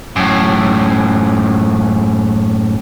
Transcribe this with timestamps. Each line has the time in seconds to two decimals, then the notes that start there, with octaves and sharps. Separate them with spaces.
0.16 F#2 A2